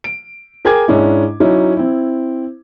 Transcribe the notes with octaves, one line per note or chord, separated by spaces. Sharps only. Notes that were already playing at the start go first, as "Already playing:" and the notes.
D7
G#4 A#4 G5 G#5 D6 G#6
G#2 G#3 C#4 D4 E4
F#3 C#4 D#4 E4
C4 E4